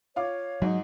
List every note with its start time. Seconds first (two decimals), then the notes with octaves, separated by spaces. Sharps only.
0.16 F4 C#5 F5 D6
0.62 G#2 F#3 D#4